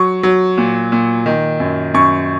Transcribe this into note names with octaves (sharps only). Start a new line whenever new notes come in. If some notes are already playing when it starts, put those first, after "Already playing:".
Already playing: F#3 C#6
F#3
A#2
A#2
D#3
F#2
F#2 C#6